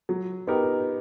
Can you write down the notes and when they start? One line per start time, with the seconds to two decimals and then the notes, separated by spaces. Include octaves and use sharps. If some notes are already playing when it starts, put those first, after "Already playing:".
0.09 F#3
0.47 B3 D#4 G4 A#4